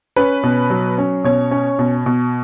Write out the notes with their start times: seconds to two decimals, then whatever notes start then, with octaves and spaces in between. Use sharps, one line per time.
0.16 C#4 B4
0.43 B2
0.70 F#3
0.98 C#4
1.24 B2 C#5
1.51 C#4
1.79 B2
2.06 B2